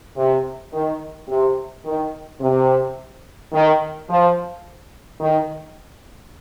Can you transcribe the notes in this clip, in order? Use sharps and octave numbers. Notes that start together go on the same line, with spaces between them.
C3
D#3
C3
D#3
C3
D#3
F3
D#3